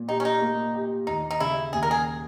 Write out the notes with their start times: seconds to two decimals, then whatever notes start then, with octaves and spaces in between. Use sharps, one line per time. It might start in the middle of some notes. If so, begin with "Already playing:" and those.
Already playing: A#2
0.08 D#4 G4
0.20 C#4
0.25 D#4
0.41 A#3
0.74 G4
1.07 D#2 D#4
1.31 D#4
1.40 C#3 E4
1.73 D#2 G#4
1.83 A#4
1.91 G#4